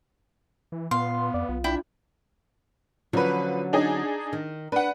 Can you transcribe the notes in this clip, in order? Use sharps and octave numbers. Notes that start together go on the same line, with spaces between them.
E3
A#2 B3 F5 C6
F2 D5
B1 F4
D4 E4 G5
D3 F3 F#3 C#4 B4
D4 D#4 G#4
D#3
D4 B4 F#5